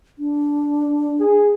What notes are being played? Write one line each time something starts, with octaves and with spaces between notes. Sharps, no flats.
D4
G#4